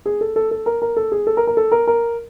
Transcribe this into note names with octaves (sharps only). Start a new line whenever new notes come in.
G#4
A4
A4
A4
A#4
A#4
A4
G#4
A4
A#4
A#4
A4
A#4
A#4